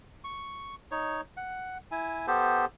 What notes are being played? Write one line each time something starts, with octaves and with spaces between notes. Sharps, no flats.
C#6
D#4 C#5
F#5
E4 G#5
B3 G4 A4 C5